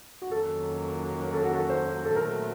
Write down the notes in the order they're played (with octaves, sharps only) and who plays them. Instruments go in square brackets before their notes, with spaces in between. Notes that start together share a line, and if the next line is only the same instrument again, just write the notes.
[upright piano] F#4
[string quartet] F2 D#3 F#3 A#3 C#4 [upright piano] A4
[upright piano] A#4
A4
F#4
A4
C5
A4
[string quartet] A#2 F#3 A3 C4 [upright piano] A#4